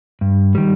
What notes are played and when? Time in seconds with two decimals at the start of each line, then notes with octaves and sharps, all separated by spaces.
0.21 G2
0.55 D#3 G3